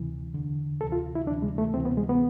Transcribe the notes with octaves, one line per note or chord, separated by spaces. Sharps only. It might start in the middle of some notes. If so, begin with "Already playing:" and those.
Already playing: D2 C3 E3
E2 D3
D2 C3 E3 A4
F4
E4
D2 C3 E3 D4
G#3
A3
D2 C3 E3 C4
B3
G#3
B3